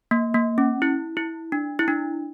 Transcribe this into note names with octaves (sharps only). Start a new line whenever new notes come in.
A#3
A#3
C#4
E4
E4
D4
E4
D4